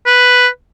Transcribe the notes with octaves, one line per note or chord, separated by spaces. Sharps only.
B4